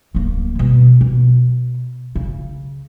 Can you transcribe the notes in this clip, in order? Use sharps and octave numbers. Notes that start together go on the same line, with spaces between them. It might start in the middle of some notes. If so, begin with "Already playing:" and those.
D1 A#3
B2 G3
B2
C#3